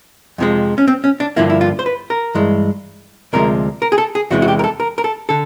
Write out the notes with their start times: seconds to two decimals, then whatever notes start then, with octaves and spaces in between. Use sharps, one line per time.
0.38 F2 C3 F3 G#3
0.78 C#4
0.88 C4
1.04 C#4
1.20 D4
1.36 G2 D3 F3 A#3 E4
1.50 E4
1.61 F4
1.79 C5
1.86 B4
2.10 A#4
2.35 G2 E3 G#3
3.33 D2 C3 F3 G#3 A#4
3.82 A#4
3.92 G#4
3.98 A4
4.15 G#4
4.31 E2 C3 E3 G#3 F#4
4.42 F#4
4.48 G4
4.59 A#4
4.64 A4
4.80 A#4
4.98 A#4
5.04 A4
5.29 D3 A4